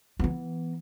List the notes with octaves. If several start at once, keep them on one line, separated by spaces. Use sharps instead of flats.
E3 B3